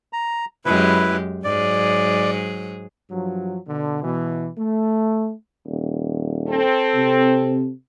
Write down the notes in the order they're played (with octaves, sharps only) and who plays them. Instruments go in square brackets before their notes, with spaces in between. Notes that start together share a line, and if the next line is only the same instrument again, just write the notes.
[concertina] A#5
[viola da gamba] F#2 G#3 G4 [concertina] E4 B4
[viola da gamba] G#2 F#3 G#4 [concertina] D5
[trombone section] G2 F3 F#3
B2 D3
B2 E3
A3
[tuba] D#1
[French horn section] C4 A4
[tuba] C3